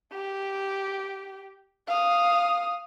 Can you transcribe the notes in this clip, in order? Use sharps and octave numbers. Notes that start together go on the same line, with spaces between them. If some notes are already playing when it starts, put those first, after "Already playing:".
G4
F5 D#6